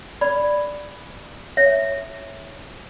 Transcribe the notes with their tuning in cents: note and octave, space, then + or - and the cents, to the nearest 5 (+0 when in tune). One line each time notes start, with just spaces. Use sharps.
D5 +0 B5 +0
C#5 +0 E5 +0